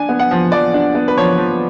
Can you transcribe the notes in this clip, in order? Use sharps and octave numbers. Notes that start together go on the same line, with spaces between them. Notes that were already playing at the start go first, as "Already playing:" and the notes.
Already playing: D4 G#5
B3
F#5
F3
F3 D5
D4
B3
B4
F3 C#5
F3